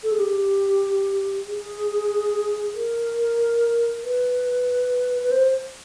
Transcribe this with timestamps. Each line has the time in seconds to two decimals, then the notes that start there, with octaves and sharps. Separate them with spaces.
0.03 A4
0.12 G#4
0.19 G4
1.47 G#4
2.75 A#4
4.03 B4
5.24 B4
5.31 C5